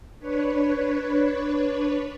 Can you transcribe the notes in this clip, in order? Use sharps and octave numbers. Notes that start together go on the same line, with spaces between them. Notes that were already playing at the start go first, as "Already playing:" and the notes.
D4 B4 C#5